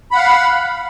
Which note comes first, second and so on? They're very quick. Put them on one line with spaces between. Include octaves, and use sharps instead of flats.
B5 F#5 F5